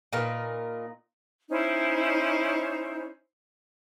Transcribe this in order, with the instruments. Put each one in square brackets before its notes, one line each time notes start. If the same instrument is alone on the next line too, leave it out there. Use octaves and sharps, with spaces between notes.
[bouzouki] A#2 D#4 A#4 B4
[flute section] C#4 D#4 E4 C5